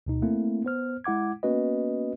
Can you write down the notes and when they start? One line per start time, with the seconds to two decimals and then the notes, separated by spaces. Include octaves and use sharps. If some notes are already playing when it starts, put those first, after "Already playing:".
0.07 D2 B2 D#4
0.22 A3 A#3 C4 E4
0.65 B3 C5 F6
1.04 G#3 E4 F#5 D6 G#6
1.43 A#3 B3 C#4 F#4 B4 D#5